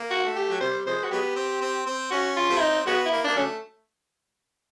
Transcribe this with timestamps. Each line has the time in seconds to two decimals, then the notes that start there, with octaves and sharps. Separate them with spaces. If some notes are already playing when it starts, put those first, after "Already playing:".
Already playing: A#3
0.11 F#4
0.24 A3
0.36 G4
0.50 F#3
0.61 C3 G3 C5
0.86 C3 F3 G#3 C5
1.04 F#4
1.11 F#3 G#3 B3 G4
1.36 C4
1.61 C4
1.86 C4
2.11 C#4 F#4
2.37 F4
2.49 G3 A3 C4
2.57 E4
2.61 D#4
2.86 F#3 G#3 B3 F#4
3.06 E4
3.11 A#3
3.25 A#3 D4
3.36 C#3 F#3 A3 C#4